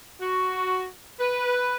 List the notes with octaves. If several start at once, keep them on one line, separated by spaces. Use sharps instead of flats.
F#4
B4